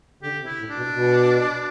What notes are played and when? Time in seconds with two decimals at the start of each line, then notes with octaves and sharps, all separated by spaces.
0.23 D3 G4
0.40 C3
0.46 E4
0.59 A2
0.70 D4
0.76 B2
0.94 B2